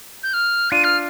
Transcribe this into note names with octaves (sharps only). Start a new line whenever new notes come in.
G6
F6
D4 F4 D#7
F6